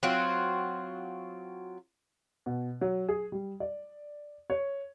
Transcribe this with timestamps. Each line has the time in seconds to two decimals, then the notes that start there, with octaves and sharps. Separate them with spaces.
0.03 F#3 C4 F4 F#4
2.46 B2
2.81 F#3
3.09 G#4
3.32 G3
3.60 D5
4.50 C#5